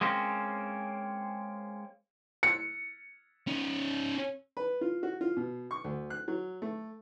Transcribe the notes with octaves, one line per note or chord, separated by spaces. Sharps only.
G#3 A#3 C4 C#4
C#7
C#4 D#4
B4
F4
F#4
F4
B2
C#6
D2
F#6
F#3
A3